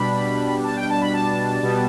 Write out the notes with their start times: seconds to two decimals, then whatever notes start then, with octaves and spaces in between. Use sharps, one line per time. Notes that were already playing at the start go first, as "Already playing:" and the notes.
Already playing: B2 G3 D4 B5
0.64 A5
0.77 G5
0.90 A5
1.01 B5
1.13 A5
1.63 B2 G3 B3